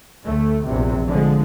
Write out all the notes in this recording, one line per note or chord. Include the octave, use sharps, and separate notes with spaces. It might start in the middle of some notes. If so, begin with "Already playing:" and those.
D2 A3
A#1 E2 C3
D3 F3 G#3